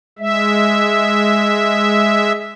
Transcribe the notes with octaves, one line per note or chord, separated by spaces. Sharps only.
G#3 E5